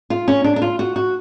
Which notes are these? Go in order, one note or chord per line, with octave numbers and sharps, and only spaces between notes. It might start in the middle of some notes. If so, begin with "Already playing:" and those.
F4
C#4
D4
D4
F4
F#4
F#4